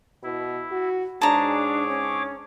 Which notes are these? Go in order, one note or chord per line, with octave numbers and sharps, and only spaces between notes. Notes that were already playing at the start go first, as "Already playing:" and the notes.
B2 E4
F#4
G#2 D4 G#4 C#5 A5 A#5 D6
C#4